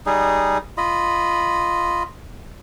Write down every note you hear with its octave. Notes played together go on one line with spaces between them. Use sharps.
G3 D#4 G#4
F4 D#5 B5